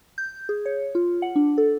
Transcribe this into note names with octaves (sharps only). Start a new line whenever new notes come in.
G6
G#4
C#5
F4
F#5
D4
A4